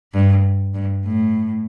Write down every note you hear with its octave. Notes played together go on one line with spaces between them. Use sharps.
G2
G2
A2